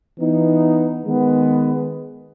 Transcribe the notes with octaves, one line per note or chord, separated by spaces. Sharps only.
E3 B3 D#4
D#3 G#3 B3